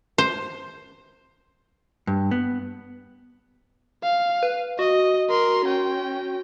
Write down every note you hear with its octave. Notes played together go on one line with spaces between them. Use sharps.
C5
G2
B3
F5
B4
F#4 D#5
A#4 C6
C#4 G5